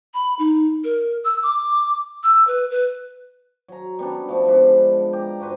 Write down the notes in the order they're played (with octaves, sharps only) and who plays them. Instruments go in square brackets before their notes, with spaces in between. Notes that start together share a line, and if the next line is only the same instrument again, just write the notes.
[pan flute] B5
D#4
A#4
E6
D6
E6
B4
B4
[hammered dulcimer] F#3 A#5
G3 B3 C#4 D4
F3 A3
F3 G#3 B3 D4
G4 A#5
G#2 F#4 B4 C5